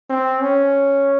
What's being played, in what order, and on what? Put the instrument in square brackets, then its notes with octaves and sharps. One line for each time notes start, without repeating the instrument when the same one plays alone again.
[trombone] C4
C#4